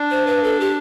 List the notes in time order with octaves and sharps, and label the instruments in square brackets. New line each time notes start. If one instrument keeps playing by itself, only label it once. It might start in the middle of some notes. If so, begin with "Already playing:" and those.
Already playing: [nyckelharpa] D4
[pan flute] C5
B4
A4
G4